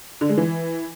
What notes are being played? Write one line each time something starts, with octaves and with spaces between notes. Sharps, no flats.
D3
G#3
E3